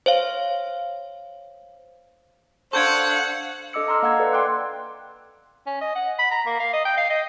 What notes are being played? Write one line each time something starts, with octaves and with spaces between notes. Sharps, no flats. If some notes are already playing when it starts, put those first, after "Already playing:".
C5 C#5 F5
D4 A4 C5 F5 F#5 C#6 G6 G#6
D4 A4 D#5 D6 E6 C#7
D#5 A#5 C6 E6 F6
A#3 F5 F#5 E6 G#6
A4 B4 D5
G5 C6 D6 F#6
C#4
D#5
F#5
B5
A#5
A#3
F5
D#5
G5
F5
D#5